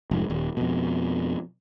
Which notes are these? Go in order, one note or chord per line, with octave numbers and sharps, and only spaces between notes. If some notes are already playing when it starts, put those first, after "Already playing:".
F1 G#2
D#1
F2 B2